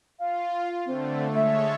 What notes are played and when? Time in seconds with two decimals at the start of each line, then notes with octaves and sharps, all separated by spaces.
0.19 F4 F5
0.86 D3 A3 C4
1.34 G#3 A3 A4 C#5 E5